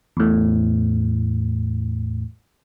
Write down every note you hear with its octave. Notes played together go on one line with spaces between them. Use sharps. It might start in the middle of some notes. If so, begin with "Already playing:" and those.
E2 A2